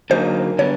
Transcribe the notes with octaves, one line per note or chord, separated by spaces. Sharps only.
D3 F#3 A#3 D#4 G#4 C5
D3 G3 B3 C#5